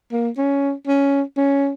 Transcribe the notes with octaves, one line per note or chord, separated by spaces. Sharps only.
A#3
C#4
C#4
C#4